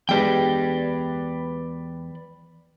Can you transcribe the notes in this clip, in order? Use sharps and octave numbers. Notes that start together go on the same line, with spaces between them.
E2 G#3 G4 B4 D5 G5